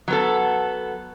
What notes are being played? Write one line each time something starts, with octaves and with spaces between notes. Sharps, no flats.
F#3 B3 A4